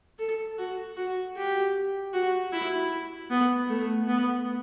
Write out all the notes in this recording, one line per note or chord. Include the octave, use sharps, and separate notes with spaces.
A4
F#4
F#4
G4
F#4
E4
B3
A3
B3